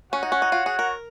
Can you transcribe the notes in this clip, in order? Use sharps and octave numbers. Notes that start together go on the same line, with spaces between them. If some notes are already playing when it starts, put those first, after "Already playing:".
C#4 F#4 C#5 F#5
D#4
C#4
D#4
F4
G#4
A#4